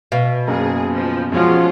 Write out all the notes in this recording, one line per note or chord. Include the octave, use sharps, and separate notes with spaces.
B2 F5
F#1 A#3 G#4
F3
E2 F3 G#3 C#4 F4 F#4